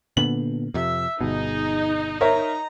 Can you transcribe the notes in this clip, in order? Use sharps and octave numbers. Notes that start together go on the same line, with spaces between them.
A#2 D3 B3 F#7
F2 C3 E5
G1 B2 D#4 G#4
A#4 C#5 E5 A#5